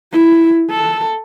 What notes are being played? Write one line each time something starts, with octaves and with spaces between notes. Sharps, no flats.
E4
A4